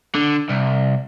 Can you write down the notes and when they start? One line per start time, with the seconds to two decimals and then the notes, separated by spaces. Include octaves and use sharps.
0.15 D3
0.49 C2